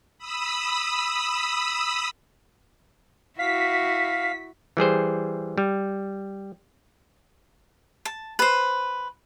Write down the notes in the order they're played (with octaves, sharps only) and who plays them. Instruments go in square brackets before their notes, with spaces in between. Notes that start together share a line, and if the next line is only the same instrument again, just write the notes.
[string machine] B5 D#6 E6
[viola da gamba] E4 F#4 [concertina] F5 [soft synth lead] B6
[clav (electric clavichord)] E3 G3 G#4 C5
G3
[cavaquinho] A5
B4 C5